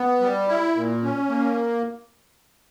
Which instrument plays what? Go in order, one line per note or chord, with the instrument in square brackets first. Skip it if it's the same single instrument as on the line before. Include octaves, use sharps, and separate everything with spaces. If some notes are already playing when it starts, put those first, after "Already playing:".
Already playing: [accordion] B3
G3
E4
A#2
C#4
A#3